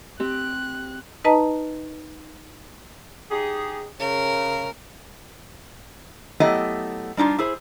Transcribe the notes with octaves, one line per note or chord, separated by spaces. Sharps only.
C4 G4 F#6
D#4 B4 D#5 A5 A#5
D#4 G4 G#4
C#3 A#4
F#3 A3 B3 E4 G4 D#5
G3 D4 D#4 F4
E4 G#4 C5